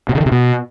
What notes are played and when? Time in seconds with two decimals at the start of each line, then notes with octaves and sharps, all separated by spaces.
0.09 B2
0.15 C#3
0.20 D#3
0.26 C3
0.32 B2